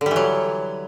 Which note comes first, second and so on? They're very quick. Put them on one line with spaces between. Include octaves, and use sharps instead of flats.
D3 G3 E3 F#3